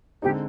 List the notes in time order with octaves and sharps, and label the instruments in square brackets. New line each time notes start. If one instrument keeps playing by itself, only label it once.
[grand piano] D3 G#3 C4 D#4 [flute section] G4